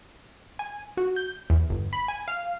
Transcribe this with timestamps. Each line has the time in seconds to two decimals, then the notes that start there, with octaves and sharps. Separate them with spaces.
0.59 G#5
0.97 F#4
1.16 G6
1.50 E2
1.70 G1
1.93 B5
2.08 G#5
2.28 F5